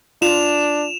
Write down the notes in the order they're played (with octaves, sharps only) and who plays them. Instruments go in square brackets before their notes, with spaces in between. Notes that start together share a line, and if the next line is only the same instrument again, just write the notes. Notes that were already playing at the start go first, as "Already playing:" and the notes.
[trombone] D4 [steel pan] F4 [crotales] E7 F7